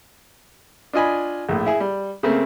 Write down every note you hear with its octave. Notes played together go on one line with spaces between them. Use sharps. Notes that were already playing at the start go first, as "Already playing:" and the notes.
D4 F4 D#5 G#5 B5
A#1 A2
E4 G#4
G3
C#3 A3 A#3 C4